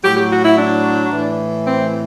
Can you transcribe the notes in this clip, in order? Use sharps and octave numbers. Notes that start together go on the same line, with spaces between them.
A2 F#3 G4
G4
F#4
E4
D4
A2 E3
C4